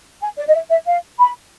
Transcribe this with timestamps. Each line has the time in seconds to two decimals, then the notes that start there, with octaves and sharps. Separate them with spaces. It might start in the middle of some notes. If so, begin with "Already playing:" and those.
0.21 G#5
0.38 D5
0.47 D#5
0.54 E5
0.69 E5
0.86 F5
1.19 B5